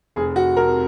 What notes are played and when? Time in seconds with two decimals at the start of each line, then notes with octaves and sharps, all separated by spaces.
0.16 F1 G#4
0.36 F#4
0.56 F2 C3 A#4